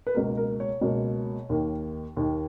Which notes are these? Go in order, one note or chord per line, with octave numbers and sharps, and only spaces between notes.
B4
C#2 B2 A#3 A#4
A#4
C#5
C#2 B2 A#3
D#2 D#3 A#3
D#2 D#3 A#3